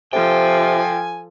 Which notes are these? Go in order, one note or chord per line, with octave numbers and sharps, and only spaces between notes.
C3 F3 A4 G5 G#5